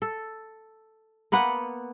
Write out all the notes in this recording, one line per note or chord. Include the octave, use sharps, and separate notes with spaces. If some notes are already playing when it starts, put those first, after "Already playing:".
A4
A#3 B3 B4 F#5